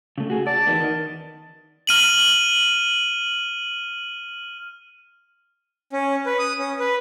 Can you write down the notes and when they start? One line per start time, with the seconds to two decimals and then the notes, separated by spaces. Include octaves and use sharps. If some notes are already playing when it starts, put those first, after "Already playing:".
0.18 C#3 A3
0.30 F#4 G#4
0.47 D5 A5
0.67 E2 D#3 B3
0.80 D#3
1.87 F6 D#7 F#7
5.93 C#4
6.26 B4
6.39 D#6
6.59 C#4
6.80 B4